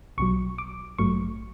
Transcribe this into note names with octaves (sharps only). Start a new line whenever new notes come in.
B1 B2 F#3 C#6
D6
A1 G2 F#3 A3 C#6